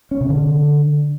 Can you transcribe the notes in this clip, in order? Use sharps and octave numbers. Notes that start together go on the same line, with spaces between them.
C#4
C3
D3